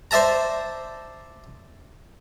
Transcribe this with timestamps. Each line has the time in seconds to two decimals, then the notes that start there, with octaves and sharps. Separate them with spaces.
0.11 C5 D5 E5 A5 A#5